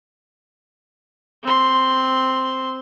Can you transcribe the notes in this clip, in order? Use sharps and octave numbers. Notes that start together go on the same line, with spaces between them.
C4 C6